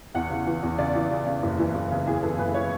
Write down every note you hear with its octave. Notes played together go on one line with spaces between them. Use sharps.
E2 F#5
C#3
E3
E2
C#3 D5
E3
C#3
C#3
F#1
E3
F#1
C#3
E2 G#4
E3 A4
F#1 B4
E3 C#5